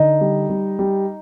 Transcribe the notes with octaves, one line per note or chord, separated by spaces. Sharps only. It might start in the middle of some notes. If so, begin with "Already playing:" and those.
Already playing: D3 D#4 D#5
G3
G3
G3